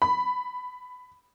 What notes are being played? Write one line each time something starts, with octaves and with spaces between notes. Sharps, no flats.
B5